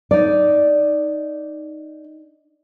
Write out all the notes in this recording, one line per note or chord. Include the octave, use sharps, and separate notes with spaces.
D#4 D5